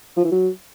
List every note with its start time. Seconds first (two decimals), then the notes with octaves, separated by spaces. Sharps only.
0.17 F3
0.24 E3
0.32 F#3